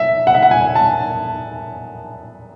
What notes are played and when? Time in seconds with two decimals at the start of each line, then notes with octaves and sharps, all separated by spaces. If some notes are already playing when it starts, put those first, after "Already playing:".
Already playing: E5
0.27 F#5
0.35 E5
0.42 F#5
0.51 G#5
0.75 A5